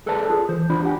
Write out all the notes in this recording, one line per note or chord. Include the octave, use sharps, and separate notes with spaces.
G#4 A4 B4 C5 D5 A5
F4 G#4 A4
E3 C5
E2 D4 F4 D5 B5
G4 F#5 G#5